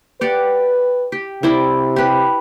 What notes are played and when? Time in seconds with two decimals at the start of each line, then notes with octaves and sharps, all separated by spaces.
0.21 G4 B4 D5 F#5
1.12 G4
1.43 C3 E4 C5 D5
1.96 G4 B4